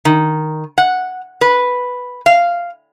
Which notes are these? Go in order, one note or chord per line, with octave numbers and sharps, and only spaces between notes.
D#3
F#5
B4
F5